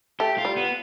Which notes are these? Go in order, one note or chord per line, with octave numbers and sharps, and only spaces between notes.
A3 G4
F4
G3
B3